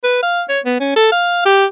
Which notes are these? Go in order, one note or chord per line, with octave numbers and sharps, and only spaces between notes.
B4
F5
C#5
B3
C#4
A4
F5
G4